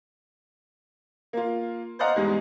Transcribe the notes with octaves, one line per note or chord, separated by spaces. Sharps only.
A#3 F4
C5 D5 D#5 F5 F#5 A#5
E2 G#2 G3 G#3